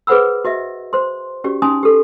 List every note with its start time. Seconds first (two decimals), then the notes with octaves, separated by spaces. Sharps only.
0.07 G#4 B4 C5 F#5 B5 E6
0.45 F#4 D#5 E5
0.93 C5 C6
1.44 C#4 F#4 G4 D5
1.62 C#4 D#4 G#5 C6 D#6
1.83 G4 A4